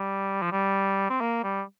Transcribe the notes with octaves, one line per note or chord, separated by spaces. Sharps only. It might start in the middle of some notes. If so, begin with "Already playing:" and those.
Already playing: G3
F3
G3
C4
A#3
G3